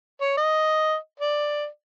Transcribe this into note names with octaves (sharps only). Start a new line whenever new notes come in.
C#5
D#5
D5